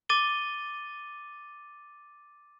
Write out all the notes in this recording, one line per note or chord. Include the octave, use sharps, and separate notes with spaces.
D6 A6 D#7 G7